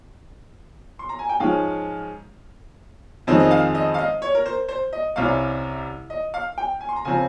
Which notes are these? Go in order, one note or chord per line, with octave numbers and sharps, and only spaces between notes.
C6
A#5
G#5
G5
G#2 F3 G#3 C#4 F5
F2 D#3 G#3 C4 D#5
D#5
F5
D#5
F5
D#5
C#5
A#4
C5
C5
D#5
C2 C3 G3 C#4 F5
D#5
F5
G5
G#5
C6
A#5
C#3 F3 C4 G#5